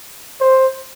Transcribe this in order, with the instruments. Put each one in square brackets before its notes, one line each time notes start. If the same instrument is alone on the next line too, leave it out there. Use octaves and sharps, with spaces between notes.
[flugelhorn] C5